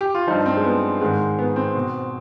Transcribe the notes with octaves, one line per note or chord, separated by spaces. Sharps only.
G4
F4
G2 F3 D#4
C4
G#3
B3
G#2 D#3 G#3
B3
C4
B2